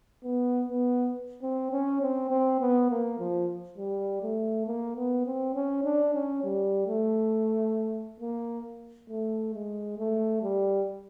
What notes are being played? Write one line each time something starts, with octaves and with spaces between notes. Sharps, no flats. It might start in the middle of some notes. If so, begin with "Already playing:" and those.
B3
B3
C4
C#4
C4
C4
B3
A#3
F3
G3
A3
A#3
B3
C4
C#4
D4
C#4
G3
A3
A#3
A3
G#3
A3
G3